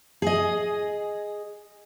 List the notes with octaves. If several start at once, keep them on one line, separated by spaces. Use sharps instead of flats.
G#4 D#5